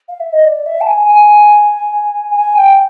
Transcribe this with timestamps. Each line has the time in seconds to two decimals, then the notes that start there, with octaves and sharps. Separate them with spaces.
0.09 F5
0.20 E5
0.33 D#5
0.45 D5
0.66 E5
0.81 A5
0.87 G#5
1.08 G#5
2.35 G#5
2.56 G5